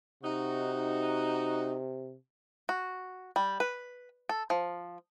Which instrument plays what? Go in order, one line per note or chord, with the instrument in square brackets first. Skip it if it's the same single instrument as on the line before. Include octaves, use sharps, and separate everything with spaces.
[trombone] C3 [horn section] D#4 F#4
[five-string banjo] F#4
G3
B4
A4
F3